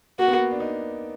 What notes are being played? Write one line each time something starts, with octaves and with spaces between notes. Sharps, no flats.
A#3 F#4
B3
A#3
D4
D#4